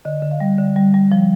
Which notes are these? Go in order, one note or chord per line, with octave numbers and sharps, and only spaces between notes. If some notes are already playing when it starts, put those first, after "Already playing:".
D3 D#5
D3
F5
G3
D3
G3
G3
F3